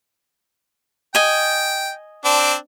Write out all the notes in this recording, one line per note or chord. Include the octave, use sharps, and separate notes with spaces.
D#5 G5 G#5
C4 D4